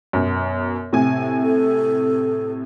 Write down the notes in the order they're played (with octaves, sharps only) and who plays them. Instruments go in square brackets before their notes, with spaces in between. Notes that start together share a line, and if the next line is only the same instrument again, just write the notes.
[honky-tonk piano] F#2 B2
A2 C3 G#5
[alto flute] A4